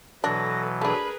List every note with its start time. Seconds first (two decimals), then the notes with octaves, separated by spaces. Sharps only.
0.24 B2 E3 F#3 D4 A4 B4 A#6
0.81 A3 D4 G#4 A#4 B4 B5